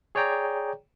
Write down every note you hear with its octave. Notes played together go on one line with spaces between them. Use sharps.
G#4 C#5 D5 G5 A#5